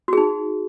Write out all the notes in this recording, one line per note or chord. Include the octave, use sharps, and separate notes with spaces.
D#4 F#4 G#4